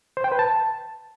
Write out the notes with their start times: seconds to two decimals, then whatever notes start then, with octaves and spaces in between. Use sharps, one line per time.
0.17 C5
0.24 G5
0.32 B4
0.39 A5